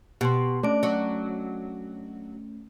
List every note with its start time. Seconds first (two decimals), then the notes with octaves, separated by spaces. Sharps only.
0.21 B2 G4 C6
0.63 A3 C#4 D4 D7
0.83 F#3